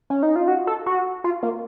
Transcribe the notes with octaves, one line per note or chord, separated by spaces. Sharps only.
C#4
D#4
F4
F#4
A4
F#4
F4
A#3